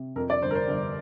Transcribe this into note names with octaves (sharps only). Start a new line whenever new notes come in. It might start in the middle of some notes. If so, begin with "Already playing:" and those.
Already playing: C3
F2 A#4
D5
G1 C5
A#4
C5
G1